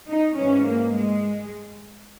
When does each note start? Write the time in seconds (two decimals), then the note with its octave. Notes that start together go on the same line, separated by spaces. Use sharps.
0.09 D#4
0.38 G#2 E3 C#4
0.67 A#3
0.97 G#3